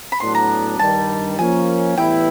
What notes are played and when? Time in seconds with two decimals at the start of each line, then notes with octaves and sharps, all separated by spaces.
0.12 B5
0.20 A2 F#3 B3 D4 C6
0.35 A#5
0.79 G2 D#3 G3 A5
1.39 F3 A#3 C#4 G#5
1.97 A2 E3 G3 B3 E4 G5